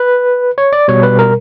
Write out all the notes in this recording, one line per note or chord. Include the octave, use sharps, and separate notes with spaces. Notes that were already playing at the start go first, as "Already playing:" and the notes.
Already playing: B4
C#5
D5
B2 G3 C#5
B4
A#4